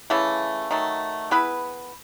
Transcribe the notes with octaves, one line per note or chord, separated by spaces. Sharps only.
C#3 E3 A3
D#3 F#3 A3
B3 E4 G#4 B4